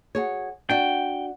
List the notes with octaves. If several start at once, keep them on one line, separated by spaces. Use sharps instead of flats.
F#4 G#4 C#5
D4 F#4 G5